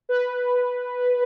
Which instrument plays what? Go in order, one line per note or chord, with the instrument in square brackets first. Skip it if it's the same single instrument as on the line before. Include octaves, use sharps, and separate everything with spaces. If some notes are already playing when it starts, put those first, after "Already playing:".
[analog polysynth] B4